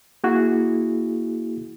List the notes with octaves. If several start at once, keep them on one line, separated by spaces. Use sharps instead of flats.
A#3 E4 F#4 G#4